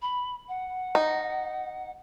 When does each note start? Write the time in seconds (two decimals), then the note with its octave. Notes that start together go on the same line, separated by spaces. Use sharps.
0.01 B5
0.48 F#5
0.95 D#4